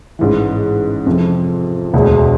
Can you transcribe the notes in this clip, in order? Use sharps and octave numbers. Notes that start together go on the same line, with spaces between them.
A1 G#2 E3
F2 C3 F3
E1 D2 D3 G#3